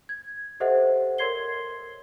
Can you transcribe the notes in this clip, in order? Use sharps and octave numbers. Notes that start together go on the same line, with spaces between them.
G#6
G4 A4 C5 D#5 E5 F#5
A#4 C#5 C6 G#6 C7 G7